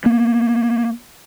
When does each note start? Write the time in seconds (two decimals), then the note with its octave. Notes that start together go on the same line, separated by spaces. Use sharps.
0.05 A#3 B3